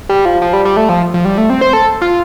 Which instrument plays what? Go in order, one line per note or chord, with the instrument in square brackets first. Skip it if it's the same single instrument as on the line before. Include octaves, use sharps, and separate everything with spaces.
[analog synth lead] G3
F3
F3
G3
G3
A3
F3
F3
G3
A3
C4
C5
A4
F4